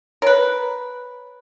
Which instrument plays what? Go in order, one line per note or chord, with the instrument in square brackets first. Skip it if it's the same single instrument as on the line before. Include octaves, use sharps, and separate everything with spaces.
[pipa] A#4 B4 [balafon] C#5